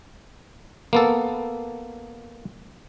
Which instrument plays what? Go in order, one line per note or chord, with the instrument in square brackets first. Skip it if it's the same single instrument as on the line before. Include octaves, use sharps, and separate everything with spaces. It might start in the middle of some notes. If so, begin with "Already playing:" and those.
[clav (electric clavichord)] A#3 B3 A4